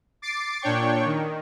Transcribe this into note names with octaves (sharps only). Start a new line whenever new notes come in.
D6 A6 C7 D7
A#2 D4 C#5 G5 C#6
D#3